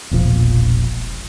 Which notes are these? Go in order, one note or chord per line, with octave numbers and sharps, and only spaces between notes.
E1 A#1 F3